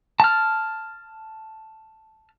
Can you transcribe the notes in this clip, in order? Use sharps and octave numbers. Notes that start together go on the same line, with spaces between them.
A5 F6